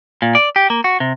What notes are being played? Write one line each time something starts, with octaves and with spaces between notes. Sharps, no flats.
A#2
D5
G4
A#3
F#4
C3